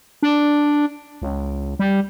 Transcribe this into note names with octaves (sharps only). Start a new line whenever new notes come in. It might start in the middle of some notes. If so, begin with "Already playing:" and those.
D4
C#2
G3